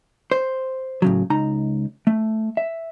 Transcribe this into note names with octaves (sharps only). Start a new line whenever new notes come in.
C5
A2 C#3 F#3
C#2 D#4 A#5
A3
E5